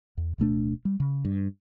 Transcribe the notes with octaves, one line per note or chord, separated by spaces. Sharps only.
E2
D1 B2 A3 D4
G3
C#3
G2